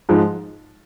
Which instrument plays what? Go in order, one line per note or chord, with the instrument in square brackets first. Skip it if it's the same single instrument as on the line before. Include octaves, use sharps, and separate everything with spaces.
[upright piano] G#2 F3 G#3